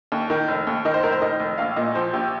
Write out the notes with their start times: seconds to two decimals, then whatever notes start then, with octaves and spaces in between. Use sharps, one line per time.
0.12 D#2
0.30 D#3
0.48 F1
0.67 D#2
0.85 D#3 D#5
0.94 C5
1.03 F1 A#4
1.12 C5
1.22 D#3 D#5
1.40 F1
1.58 A#1 F5
1.76 A#2 D#5
1.95 F3 C5
2.13 A#1 G4